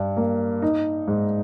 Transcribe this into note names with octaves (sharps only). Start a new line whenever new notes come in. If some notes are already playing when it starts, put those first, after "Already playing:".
Already playing: G2
A#3
D#4
G#2